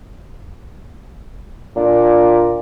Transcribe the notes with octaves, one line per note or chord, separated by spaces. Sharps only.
A#2 D4